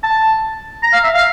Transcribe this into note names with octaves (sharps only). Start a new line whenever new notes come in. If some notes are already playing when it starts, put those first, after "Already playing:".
A5
A#5
F5
E5
F5